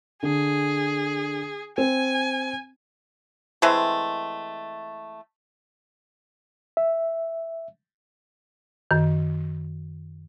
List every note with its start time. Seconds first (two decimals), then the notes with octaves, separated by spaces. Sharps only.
0.23 D3 G#4
1.78 C4 G#5
3.62 E3 G#3 A3 C4
6.77 E5
8.91 F#2 D#3